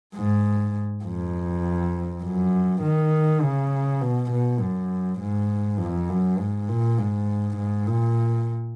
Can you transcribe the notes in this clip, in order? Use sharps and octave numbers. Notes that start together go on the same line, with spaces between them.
G#2
F2
F#2
D#3
C#3
B2
B2
F#2
G#2
F2
F#2
G#2
A#2
G#2
G#2
A#2